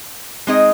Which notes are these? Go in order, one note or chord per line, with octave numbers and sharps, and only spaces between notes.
G#3 C4 D#4 G#4 D#5